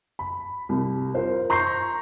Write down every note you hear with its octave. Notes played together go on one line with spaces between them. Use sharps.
B5
C2
F4 A#4 C5
A#5 C6 C#6 G6 A#6 C7